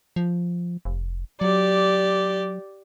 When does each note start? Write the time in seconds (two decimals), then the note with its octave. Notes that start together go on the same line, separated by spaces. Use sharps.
0.16 F3
0.85 F1
1.41 F#3 G4 D5